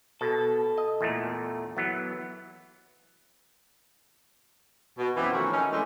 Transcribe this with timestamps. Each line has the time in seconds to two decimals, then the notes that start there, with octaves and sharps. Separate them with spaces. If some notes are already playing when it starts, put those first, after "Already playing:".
0.21 B2 A4
0.78 D#5
1.01 E2 A#2 A3
1.77 E3 F#3 B3
4.98 B2
5.17 F#2 E3 B3 C4 E4 G4
5.33 D#3 F3 A3 C#4 F#4 A#4
5.53 C#4 D#4
5.72 E3 G#3 A3 B3 D4 D#4